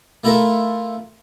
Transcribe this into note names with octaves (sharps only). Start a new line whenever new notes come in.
A3 E4 F4 A4 A#4